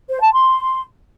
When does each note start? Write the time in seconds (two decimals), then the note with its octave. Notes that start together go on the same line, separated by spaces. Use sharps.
0.09 C5
0.21 A5
0.33 C6